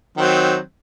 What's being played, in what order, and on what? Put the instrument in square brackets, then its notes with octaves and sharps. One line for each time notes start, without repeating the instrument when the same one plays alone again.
[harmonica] D#3 F#3 C4